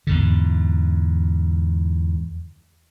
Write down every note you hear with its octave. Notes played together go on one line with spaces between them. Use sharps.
E2 G#2 D3